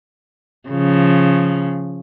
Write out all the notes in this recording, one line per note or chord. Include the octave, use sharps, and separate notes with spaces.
C#3 F3